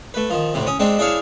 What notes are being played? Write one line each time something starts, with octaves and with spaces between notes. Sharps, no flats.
A3 B4
D#3 F3
D2 A2 C3
C#4 D#6
G#3 C4 D4 D#4
D4 E4 G#4 C#5 F5 C#6